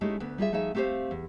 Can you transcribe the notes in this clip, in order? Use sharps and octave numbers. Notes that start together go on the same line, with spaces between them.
G#3 A3 C#4 D#4 E4 G4
D2 B3
G3 F4 G#4 E5
F3 A3 D#4 G#4 E5
A3 C4 G4 A#4 C5 F5
E2